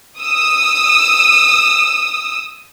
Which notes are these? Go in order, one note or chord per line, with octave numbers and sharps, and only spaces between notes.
D#6 E6